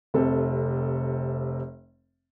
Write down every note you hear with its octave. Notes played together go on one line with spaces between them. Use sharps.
F1 C3 A4